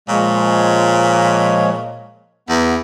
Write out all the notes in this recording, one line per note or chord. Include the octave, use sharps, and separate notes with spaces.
A#2 F3 G#3 C#5
E2 B3